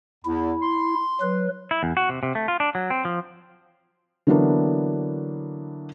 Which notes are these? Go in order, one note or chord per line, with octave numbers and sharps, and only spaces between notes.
E2 E4
C6
F#3 B4
E4
E2
F#4
C3
C3
A3
F4
D4
F#3
C4
F3
D3 E3 F#3 A#3 B3 D4